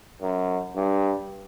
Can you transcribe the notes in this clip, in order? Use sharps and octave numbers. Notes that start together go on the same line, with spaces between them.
F#2
G2